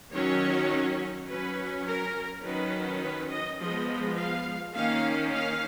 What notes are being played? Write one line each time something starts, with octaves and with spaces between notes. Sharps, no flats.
D#3 F#3 C#4 C#5
F#3 C#4 B4
A#4
D#3 F#3 C#4 B4
B4
D#5
F3 G#3 B3 D#5
F5
D#3 A#3 C#4 F5
F5